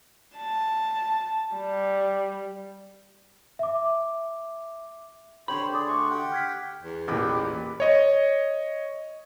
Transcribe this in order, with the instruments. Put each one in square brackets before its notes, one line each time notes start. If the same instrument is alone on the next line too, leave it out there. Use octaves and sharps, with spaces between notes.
[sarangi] A5
G3
[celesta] E5 D6
[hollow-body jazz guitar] D3 B5 [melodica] G4 C5 C#5 [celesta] F#7
[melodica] G#4 D5 [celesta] D6 D#6
[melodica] A3 F#4 C#6 [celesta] C6
[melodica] G4 F#5 G5
[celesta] F6 G#6 B6
[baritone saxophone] E2
[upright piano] A1 A#2 [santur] G4 B4
[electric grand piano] C#5 D#5